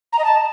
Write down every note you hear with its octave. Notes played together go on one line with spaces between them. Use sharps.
A#5
D#5
A5